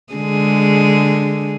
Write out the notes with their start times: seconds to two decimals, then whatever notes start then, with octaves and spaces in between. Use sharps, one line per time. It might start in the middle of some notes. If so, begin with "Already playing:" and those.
0.14 D3 G#3 G#4